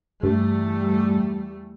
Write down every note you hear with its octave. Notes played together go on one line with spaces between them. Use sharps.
E2 G2 G3 A3